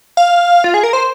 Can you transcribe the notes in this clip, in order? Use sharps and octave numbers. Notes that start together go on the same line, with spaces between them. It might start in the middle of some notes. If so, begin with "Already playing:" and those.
F5
F4
G#4
A#4
C5